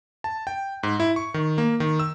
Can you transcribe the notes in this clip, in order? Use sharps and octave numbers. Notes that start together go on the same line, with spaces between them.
A5
G5
G#2
E4
C#6
D#3
A#3
D#3
E6